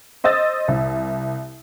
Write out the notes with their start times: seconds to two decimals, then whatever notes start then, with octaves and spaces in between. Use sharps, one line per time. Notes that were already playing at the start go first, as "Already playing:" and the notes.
0.24 C5 D#5 D#6 E6 A6
0.68 C2